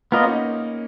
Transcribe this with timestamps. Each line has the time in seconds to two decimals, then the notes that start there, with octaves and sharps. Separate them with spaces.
0.12 A#3 B3 F4 A#4 D#5
0.23 C#4
0.29 D#4